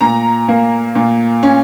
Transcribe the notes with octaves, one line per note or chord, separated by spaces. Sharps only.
A#2 A#5
A#3
A#2
C#4